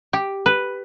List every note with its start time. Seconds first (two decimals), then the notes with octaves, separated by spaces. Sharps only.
0.13 G4
0.46 B4